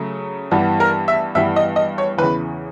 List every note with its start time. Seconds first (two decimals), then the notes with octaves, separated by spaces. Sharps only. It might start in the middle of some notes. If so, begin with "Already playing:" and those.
Already playing: C#3 F#3 A3
0.51 G2 E3 G3 B3
0.80 A#4
1.08 E5
1.35 G2 E3 G3 B3 E5
1.56 D#5
1.76 D#5
1.98 C#5
2.18 E2 C#3 E3 B4